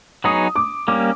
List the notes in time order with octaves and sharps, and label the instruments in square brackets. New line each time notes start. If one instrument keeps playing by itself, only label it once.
[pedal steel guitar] F#3 B3 D#4 G#4 C#5 [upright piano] D#6
[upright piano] D6
[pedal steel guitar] G3 A#3 C#4 [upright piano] D6